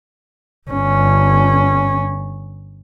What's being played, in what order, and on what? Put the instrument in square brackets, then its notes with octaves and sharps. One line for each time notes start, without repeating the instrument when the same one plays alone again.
[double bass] G1 C#4